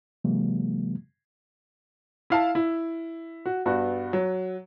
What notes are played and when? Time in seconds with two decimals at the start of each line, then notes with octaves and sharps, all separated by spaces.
0.24 C3 E3 F#3 G#3 A#3
2.30 E4 F5 A5
2.55 E4
3.46 F#4
3.66 G2 B3 F#4
4.13 F#3